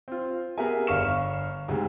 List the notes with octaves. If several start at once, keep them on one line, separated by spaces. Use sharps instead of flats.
C4 F4
B3 G4 G#4 A#4 E5 G#5
G1 D4 F5 C#6 F6 E7
D2 G#2 C3